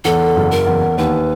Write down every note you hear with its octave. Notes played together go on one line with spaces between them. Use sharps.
E2 A4
F#1
A#4
E2
D#2 B4